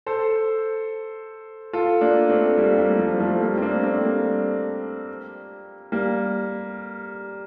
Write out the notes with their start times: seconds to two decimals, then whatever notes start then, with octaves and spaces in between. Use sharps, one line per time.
0.06 A4 C5
1.73 F4 A4
2.01 A#3 D4
2.29 A3 C4
2.57 G3 A#3
2.78 G3 A#3
2.99 F3
3.20 F3 A3
3.41 G3 A#3
3.58 C4
3.62 A#3 D4
3.82 A3 C4
4.03 G3 A#3
5.92 G3 A#3